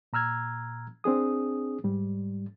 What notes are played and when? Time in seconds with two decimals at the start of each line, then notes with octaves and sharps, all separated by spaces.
0.13 A#2 A#5 E6 F6 G#6
1.04 C4 D4 G#4 D#6
1.84 G#2 G3